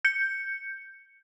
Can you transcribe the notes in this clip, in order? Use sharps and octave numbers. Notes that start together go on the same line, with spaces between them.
G6 C#7